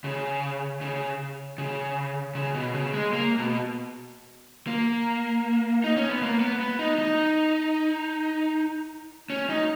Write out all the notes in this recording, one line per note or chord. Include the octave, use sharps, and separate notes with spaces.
C#3
C#3
C#3
C#3
B2
C#3
G#3
A#3
B2
A#3
D#4
C#4
B3
A#3
B3
B3
D#4
D#4
C#4
D#4